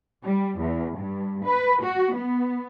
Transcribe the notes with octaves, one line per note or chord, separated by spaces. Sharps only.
G3
E2
G2
B4
F#4
B3